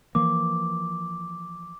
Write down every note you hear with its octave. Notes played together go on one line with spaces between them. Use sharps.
E3 F3 A#3 D6